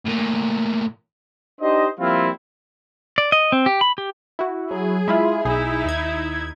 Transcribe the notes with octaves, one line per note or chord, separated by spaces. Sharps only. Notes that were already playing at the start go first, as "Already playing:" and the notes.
A2 A#3
D4 D#4 G4 C5 D#5
F3 G3 A#3 C4 E4 F4
D5
D#5
C4
G4
B5
G4
E4 F#4
F#3 G#4
G#3 E4 F4 E5 B5
B1 D#4 E4 G#4
D#2 G#6